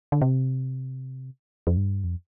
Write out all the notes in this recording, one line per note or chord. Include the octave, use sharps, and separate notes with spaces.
D3
C3
F2
G2
F2